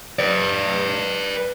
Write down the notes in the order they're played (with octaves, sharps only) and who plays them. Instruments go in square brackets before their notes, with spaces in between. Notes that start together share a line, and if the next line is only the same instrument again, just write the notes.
[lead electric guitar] B4 D5